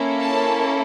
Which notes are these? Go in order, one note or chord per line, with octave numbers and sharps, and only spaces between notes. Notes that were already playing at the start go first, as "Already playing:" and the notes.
Already playing: A#3 C#4 E4 A4
A5